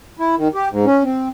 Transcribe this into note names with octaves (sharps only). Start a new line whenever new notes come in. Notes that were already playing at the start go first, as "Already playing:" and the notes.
E4
D#3
G4
G#2
C#4
C4